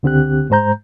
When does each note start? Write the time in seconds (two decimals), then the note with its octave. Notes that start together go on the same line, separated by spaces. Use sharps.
0.03 C#2 D3 C4 G4 F#6
0.50 G#2 G#3 C5 A#5 G6